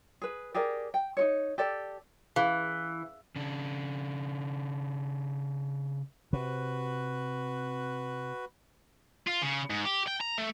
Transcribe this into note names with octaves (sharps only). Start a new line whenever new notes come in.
G#4 B4
G4 G#4 A#4 D5
G5
D#4 F#4 C#5
G4 A4 D5
E3 C#4 G#4 F5
C#3 D4
C3 F#4 B4
F4
C#3
G#2
G4
G5
A#5
A3